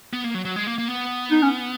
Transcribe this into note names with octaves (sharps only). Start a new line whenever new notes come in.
B3
A#3
F#3
F#3
G#3
A#3
A#3
B3
D#4
C#4